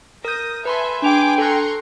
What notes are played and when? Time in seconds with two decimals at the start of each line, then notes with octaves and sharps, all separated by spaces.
0.25 A#4 D#6 G6 A#6
0.65 A4 B4 E5 G#5 B5 C6
1.02 D4 G#4 G5 G#5 D6 F7
1.38 A4 A#5 C6 C#6 F#6